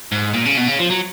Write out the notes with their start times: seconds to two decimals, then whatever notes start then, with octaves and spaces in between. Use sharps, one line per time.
0.12 G#2
0.33 A#2
0.45 C#3
0.57 B2
0.67 C#3
0.79 F3
0.90 F#3